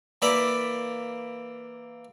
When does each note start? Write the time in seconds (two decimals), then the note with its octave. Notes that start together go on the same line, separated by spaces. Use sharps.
0.22 E3 A#3 D5 E5 B5